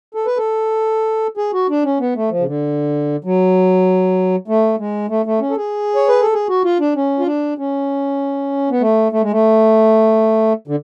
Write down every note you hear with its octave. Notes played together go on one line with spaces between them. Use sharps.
A4
B4
A4
G#4
F#4
D4
C#4
B3
A3
F3
C#3
D3
F#3
A3
G#3
A3
A3
C#4
A4
G#4
C#5
B4
A4
G#4
F#4
F4
D4
C#4
F4
D4
C#4
B3
A3
A3
G#3
A3
D3